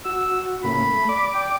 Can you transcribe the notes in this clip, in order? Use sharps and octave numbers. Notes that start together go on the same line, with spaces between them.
F#4 E6
A2 C#3 A#3 B5
A3
D5 D6
G5